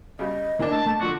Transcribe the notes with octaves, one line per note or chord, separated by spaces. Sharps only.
C#3 G3 D#5
D2 A#3 D4 E4 G#5
A3 A5
A3 A5
D3 F3 D4 F#4